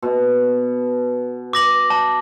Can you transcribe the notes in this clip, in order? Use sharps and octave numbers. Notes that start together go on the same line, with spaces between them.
B2
D6 A#6 F#7
A5